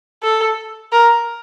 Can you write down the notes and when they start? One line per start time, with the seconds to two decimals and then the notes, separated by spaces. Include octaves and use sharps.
0.23 A4
0.92 A#4